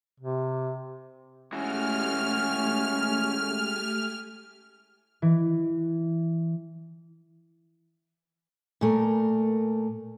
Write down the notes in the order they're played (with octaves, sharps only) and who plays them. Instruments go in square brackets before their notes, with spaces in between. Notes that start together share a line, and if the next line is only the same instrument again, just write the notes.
[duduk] C3
[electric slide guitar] G#3 E4 F#4 [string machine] A3 G4 G#5 [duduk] C#4 [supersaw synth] F6
[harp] E3
[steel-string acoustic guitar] A#2 A3 A#4